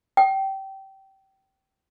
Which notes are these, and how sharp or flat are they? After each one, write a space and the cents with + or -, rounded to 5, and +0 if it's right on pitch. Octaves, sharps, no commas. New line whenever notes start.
G5 -20